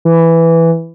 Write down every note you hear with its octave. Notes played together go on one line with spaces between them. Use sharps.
E3